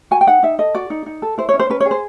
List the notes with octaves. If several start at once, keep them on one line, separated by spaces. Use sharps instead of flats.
F#4 G#5
G5
D#4 F#5
D#4 E5
A4 D#5
F#4 D5
D#4
D#4
A4
E4 C5
C#5
C#4
C5
C#4 B4
C#5
G#4
C5